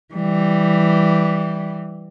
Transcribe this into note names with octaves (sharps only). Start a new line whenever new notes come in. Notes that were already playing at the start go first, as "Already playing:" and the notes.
E3 G3